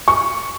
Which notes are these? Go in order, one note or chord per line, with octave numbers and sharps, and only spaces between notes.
C#6